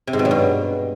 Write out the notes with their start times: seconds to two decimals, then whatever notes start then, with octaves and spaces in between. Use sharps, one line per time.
0.07 C3
0.13 G#2
0.19 B2
0.25 F#3
0.31 G2